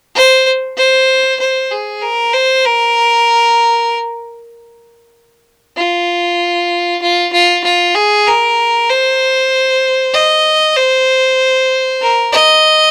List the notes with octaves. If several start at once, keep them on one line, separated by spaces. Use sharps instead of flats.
C5
C5
C5
G#4
A#4
C5
A#4
F4
F4
F4
F4
G#4
A#4
C5
D#5
C5
A#4
D#5